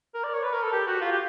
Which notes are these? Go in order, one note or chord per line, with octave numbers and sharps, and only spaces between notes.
A#4
D5
C#5
B4
A#4
A4
G4
F#4
F4
G4